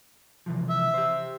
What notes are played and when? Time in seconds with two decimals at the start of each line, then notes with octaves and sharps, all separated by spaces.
0.46 C3 E3 F3
0.70 E5
0.94 G4 C5